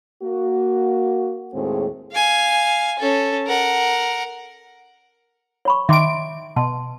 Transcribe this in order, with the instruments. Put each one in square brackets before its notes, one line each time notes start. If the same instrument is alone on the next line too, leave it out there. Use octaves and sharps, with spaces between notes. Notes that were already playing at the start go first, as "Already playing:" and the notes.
[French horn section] A#3 F#4
D#2 A2 G#3 C4 G#4
[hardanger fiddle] F5 G#5
C#4 A4
A#4 F#5
[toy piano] C#5 B5 C#6
[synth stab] D#3 D7 [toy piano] E5 C6 D6
[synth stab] B2 [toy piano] A5 C6